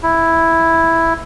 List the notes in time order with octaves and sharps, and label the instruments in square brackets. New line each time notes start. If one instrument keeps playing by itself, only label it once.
[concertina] E4